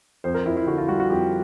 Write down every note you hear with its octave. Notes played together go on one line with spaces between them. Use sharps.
F2 C5
A#4
F2 E4
E4
D3 F#4
F4
G3 F#4
F#4
F2 G4